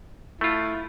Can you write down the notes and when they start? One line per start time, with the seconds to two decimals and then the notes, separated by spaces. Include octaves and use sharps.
0.41 A3 E4 F4